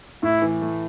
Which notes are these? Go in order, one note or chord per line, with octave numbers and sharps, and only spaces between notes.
A2 E4
E3
A3